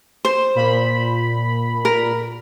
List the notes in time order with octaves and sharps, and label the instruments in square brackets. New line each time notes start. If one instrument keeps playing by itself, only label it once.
[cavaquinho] C5
[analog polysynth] A#2 B5
[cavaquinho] A#4